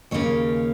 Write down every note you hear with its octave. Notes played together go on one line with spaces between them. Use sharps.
D#2 C#3 A#3 C#5